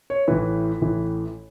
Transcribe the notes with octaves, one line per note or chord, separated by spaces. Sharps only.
C#5
A1 A2 E3 B4
A1 A2 E3